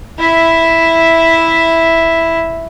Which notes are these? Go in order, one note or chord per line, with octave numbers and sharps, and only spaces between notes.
E4 E5